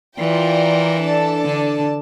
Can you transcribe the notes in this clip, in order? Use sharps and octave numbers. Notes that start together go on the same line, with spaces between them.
E3 F4 A#4 D5 G5
D4 A4 D5 A5
D3